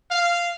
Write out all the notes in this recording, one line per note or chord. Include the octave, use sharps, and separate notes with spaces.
F5